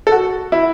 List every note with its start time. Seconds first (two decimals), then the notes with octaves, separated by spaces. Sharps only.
0.07 A4
0.12 F#4
0.52 E4